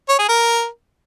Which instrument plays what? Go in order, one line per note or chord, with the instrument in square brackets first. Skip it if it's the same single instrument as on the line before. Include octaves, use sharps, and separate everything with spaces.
[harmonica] C#5
G#4
A#4